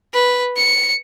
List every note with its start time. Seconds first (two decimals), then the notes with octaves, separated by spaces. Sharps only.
0.14 B4
0.57 C#7